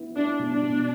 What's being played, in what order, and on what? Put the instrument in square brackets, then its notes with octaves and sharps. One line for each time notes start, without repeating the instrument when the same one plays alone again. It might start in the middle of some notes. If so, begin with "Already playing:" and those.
Already playing: [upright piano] B3 E4
[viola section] D4 [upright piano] E4
[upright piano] B2
[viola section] D4
[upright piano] B2